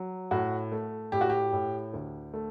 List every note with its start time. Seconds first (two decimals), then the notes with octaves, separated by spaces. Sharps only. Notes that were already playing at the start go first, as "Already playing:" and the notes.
Already playing: F#3
0.31 A2 F#4
0.72 A3
1.12 A2 G4
1.21 F#4
1.30 G4
1.53 A2
1.94 D2
2.34 A3